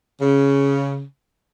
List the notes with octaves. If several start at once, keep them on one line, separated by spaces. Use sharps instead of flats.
C#3